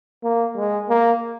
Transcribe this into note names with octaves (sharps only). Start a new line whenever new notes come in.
A#3
G#3
A#3